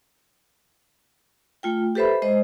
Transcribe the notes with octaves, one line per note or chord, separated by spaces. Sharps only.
A3 F4 G5
G4 A4 B4 C5 E5 B5
G#3 C5 D#5